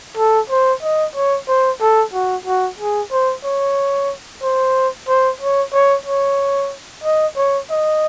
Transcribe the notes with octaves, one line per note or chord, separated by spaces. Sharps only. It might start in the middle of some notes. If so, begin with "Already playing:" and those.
A4
C5
D#5
C#5
C5
A4
F#4
F#4
G#4
C5
C#5
C5
C5
C#5
C#5
C#5
D#5
C#5
D#5